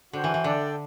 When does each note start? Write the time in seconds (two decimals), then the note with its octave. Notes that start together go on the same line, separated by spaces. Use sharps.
0.13 D3 F#4 C5 G5
0.24 E3
0.34 E3
0.44 D3 D4 A4 D5 G5